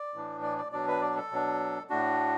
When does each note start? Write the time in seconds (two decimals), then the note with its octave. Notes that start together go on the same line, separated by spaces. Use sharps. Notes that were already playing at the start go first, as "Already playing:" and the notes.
Already playing: D5
0.14 A2 E3 D4
0.43 D5
0.58 D5
0.72 B2 F#3 D4 D5
0.88 B4
1.02 D5
1.17 A4
1.32 B2 F#3 D4
1.90 A2 A3 D4 F#4